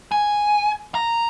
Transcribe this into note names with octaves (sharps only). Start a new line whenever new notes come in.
G#5
A#5